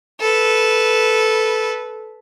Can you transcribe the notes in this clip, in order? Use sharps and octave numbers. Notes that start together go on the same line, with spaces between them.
A4 B4